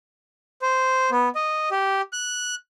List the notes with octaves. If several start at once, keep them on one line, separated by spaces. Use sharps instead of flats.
C5
B3
D#5
G4
F#6